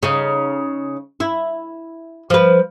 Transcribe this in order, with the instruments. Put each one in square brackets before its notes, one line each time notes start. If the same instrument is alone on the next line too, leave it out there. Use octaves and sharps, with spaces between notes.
[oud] C#3 D#4
E4
F3 B4